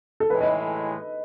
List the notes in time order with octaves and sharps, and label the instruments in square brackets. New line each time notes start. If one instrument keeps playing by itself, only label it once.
[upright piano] A4
[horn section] A2 E3 G#3 [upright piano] B4
[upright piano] D#5